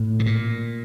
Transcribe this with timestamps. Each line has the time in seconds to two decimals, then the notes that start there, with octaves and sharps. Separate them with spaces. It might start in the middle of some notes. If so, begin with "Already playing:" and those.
Already playing: A2
0.19 C3
0.26 A#2